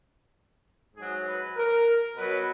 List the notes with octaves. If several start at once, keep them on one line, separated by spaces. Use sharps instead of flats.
G#2 F#3 G#4
B4
A#4
B2 F#3 B4